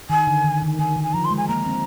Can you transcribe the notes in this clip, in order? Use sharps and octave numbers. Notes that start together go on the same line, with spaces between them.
D#3 G#5
D3
D#3
D#3
D#3 G#5
D#3
G#5
F3 A#5
C6
G#3
G#5
A#3 A#5
C4